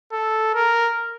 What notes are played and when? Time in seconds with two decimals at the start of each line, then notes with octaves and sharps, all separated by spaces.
0.12 A4
0.55 A#4